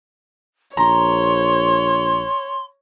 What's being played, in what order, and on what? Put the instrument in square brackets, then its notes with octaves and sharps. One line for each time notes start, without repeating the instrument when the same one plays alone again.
[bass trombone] A#1 [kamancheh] C#5 [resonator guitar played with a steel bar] A#5 [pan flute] C6